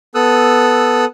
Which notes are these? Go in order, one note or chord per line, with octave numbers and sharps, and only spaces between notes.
B3 A4 D#6 E6 F#6